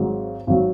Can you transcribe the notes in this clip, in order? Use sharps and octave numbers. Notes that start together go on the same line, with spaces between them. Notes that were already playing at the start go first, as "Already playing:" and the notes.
Already playing: G#1 G#2 F#3
G#1 F#3